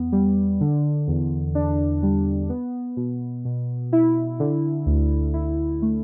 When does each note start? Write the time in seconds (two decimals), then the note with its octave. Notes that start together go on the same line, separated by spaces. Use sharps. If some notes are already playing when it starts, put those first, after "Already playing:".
Already playing: E2 B3
0.12 G3
0.61 D3
1.08 E2
1.55 D4
2.03 G3
2.49 B3
2.97 B2
3.45 B2
3.93 E4
4.40 D3
4.86 D2
5.34 E4
5.82 A3